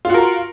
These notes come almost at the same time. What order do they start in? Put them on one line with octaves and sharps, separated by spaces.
F4 F#4 A#4